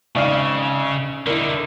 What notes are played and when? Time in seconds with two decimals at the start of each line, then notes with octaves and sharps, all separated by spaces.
0.16 G#1 C#3 D5 F5
1.27 D3 D#4 E4 A#4